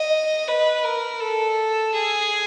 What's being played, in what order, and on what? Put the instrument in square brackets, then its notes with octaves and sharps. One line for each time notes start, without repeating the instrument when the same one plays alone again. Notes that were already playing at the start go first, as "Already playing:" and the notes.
Already playing: [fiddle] D#5
B4
A#4
A4
G#4